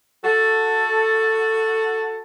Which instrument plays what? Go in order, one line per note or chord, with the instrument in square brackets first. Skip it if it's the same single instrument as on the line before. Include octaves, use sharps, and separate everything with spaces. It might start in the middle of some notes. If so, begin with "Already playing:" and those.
[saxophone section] F#4 A4